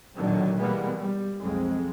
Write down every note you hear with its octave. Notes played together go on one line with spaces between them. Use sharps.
B1 A#2 D3 D#3 F#3
B2 E3 G3 G#3 A#3 B3
G3
B1 F2 G#3 C4